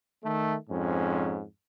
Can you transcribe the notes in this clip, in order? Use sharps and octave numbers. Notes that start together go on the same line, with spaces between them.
D#3 A3
F2 G#2 C#4